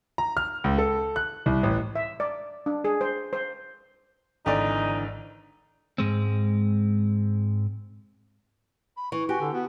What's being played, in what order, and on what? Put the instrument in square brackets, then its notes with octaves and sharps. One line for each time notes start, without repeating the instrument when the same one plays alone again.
[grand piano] A#5
F6
C#2
A4
F#6
C2
A1
[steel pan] E5
D5
D4
G#4
C5
C5
[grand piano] G#1 D5 [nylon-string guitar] D3 E3 [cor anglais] D#4
[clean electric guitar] G#2 G#3 C4
[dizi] B5
[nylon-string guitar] E3 [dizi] C#6
[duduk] F#4 [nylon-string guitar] G4 [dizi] G#5
[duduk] D3
[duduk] B3 [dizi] F#4